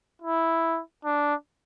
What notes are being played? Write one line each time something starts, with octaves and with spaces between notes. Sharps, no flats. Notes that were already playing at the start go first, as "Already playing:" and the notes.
E4
D4